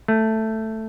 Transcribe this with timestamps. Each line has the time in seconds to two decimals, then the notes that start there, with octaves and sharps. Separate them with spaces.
0.08 A3